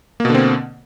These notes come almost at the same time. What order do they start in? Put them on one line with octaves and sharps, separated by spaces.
A#3 B2 D3 C4